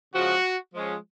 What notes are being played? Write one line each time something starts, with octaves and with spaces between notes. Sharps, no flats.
C#3 F3 G#3 F#4
F3 G#3 C#4